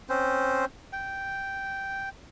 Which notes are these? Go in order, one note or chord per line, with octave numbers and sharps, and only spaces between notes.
C4 C#4 C5
G5